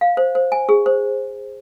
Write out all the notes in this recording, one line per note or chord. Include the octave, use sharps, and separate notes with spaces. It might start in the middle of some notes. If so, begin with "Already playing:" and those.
F5
C5
C5
G#5
G#4
C5